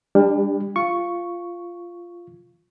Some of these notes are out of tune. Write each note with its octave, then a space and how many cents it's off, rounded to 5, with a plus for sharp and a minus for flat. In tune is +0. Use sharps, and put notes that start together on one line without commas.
G3 +35 D4 +0 G4 +0
F4 -5 C#6 +0